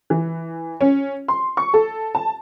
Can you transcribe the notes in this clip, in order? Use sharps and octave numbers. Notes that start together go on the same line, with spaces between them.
E3
C#4
C6
C#6
A4
A5